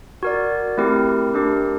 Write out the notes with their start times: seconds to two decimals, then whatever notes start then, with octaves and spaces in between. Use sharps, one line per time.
0.23 F#4 A#4 D5
0.78 A3 C4 E4 G4 A#4
1.33 A3 D4 G4 A#4